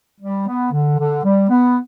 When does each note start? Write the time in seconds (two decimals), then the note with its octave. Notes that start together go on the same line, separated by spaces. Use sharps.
0.20 G3
0.47 B3
0.72 D3
0.98 D3
1.24 G3
1.49 B3